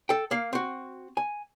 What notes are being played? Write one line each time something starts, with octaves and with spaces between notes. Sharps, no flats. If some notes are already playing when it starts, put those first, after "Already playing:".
A4 G5
A#3 F5
C4 F#4
G#5